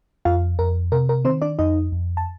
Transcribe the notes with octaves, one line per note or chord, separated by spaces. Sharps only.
F2 F4 F5
F2 A#4
C3 A#4
A#4
D#3 C4 C5
D4 D5
F2 D#4 D#5
F2
A5